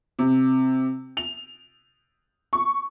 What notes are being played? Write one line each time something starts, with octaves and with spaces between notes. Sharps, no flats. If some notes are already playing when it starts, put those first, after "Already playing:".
C3
F7
C#6